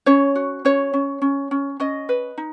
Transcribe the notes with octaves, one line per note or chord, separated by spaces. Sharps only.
C#4 C#5
F#4
C#4 C#5
C#4
C#4
C#4
C#4 D#5
B4
D#4